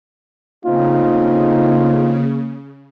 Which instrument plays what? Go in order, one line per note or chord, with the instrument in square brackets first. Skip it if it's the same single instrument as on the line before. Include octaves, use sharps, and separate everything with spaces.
[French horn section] A2 C4 D#4 [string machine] C#3 [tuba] A#3 [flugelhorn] F4